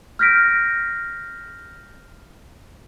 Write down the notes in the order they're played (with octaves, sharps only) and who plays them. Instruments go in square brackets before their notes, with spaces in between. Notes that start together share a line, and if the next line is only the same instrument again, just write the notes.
[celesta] F6 G6 A#6 B6 D7